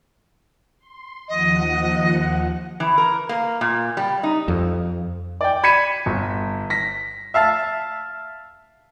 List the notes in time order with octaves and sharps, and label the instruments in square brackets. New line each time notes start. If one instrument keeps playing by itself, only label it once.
[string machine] C6
[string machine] D#2 F3 F#5 [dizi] D#5
[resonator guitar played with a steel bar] E3
A#4
A#3
A#2
G3
D#4
[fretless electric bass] F2
[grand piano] D5 G5
B5 G#6 B6 C#7 D#7 E7
G1
A#6 B6
[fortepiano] E5 F5 A5